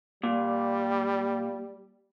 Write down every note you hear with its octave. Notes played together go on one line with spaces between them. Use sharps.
A#2 G3